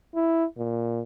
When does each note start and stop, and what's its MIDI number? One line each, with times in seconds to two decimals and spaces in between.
0.15 0.45 64
0.58 1.02 46